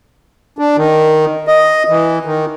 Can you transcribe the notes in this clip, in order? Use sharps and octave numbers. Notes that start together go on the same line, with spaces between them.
D4
D#3
D#5
E3
D#3